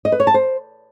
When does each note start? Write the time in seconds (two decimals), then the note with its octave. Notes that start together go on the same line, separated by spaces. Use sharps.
0.05 D#5
0.12 B4
0.20 C#5
0.27 A5
0.34 C5